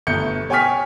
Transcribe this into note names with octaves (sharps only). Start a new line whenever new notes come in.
G1 B2 A3 G6 C#7
C#5 G5 G#5 C#6 F6 B6